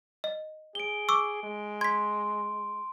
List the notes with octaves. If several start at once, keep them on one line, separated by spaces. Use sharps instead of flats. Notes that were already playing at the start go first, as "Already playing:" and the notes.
D#5
G#4 D7 G7
C#6 D6 E6
G#3
C6 G#6 B6